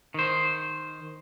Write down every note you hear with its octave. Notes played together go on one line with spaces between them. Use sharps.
D#3 C5